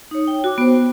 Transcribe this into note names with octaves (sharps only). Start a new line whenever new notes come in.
D#4 C#5
G5
F#4 G5 D6
B3 C5